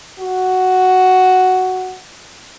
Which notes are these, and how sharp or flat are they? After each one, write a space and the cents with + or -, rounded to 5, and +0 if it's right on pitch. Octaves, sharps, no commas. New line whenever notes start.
F#4 +5